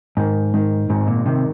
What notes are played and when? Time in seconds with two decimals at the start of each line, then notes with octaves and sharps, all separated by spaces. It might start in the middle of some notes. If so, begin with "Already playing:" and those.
0.17 G#2 D#3
0.54 D#3
0.90 G#1 G#2
1.07 A#2
1.26 C3 D#3